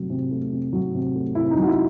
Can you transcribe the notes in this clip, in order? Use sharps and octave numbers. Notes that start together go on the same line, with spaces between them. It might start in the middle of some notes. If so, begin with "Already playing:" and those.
Already playing: C3 F#3 A3
C3
A3
C3
F#3
C3
A3
C3 E4
D#4
F#3
F#4
E4